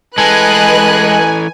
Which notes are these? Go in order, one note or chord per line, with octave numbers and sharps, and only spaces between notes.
E3 G#3 A4 B4 D#5 G#5 F#6